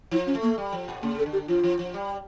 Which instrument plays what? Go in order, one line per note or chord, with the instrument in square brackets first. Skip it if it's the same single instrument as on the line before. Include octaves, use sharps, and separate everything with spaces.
[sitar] F3 [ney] E4
[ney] C#4
[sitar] A3
[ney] A#3
[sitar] G3
F3
A#2
[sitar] C#3 [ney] A#3
[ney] A4
[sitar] D3
[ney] G4
[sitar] F3 [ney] F4
[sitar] F3
F3
G3